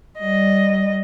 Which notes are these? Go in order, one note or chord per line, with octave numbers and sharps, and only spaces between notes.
G3 D#5